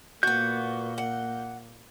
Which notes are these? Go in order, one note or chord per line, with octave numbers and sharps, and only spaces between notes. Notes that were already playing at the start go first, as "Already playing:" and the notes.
A#2 A#3 B3 F#4 G6
F#5